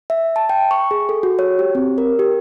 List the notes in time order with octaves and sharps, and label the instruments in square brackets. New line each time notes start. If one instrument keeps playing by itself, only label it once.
[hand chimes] E5
A5
G5
C#6
G#4
A4
F#4
C#5
G4
C4
A#4
G4